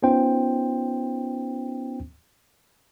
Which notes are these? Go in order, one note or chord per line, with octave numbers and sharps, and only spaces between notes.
B3 C#4 D#4 F4 C5 G5